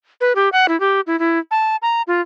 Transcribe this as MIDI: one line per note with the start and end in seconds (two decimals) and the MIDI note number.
0.21 0.33 71
0.36 0.49 67
0.52 0.66 78
0.68 0.79 64
0.80 1.01 67
1.07 1.18 64
1.19 1.39 64
1.51 1.76 81
1.82 2.02 82
2.07 2.21 65